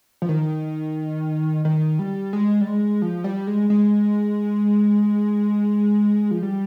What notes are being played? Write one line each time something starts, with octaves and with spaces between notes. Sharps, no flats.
F3
D#3
D#3
G3
G#3
G3
G#3
F3
G3
G#3
G#3
F3
G3